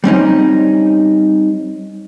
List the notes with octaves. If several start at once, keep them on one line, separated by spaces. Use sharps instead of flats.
G3 C4 C#4 D#4